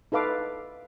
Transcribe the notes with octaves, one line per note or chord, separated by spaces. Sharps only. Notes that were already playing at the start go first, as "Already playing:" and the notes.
D#4 A4 B4 F5 D6